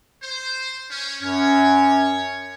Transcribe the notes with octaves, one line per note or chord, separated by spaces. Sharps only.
C5
C#4
F#2 C#4 C#5